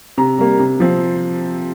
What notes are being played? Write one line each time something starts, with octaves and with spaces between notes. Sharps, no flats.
C3 A#5
G3 A#3
C3
F3 C4